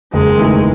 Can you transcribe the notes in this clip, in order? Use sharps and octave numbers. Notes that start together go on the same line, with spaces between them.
F#1 G#3
E2 D#3 A3 E4